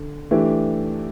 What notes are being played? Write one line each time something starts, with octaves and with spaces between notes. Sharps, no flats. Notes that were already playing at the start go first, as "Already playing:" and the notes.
Already playing: D3
E3 A3 D4 G4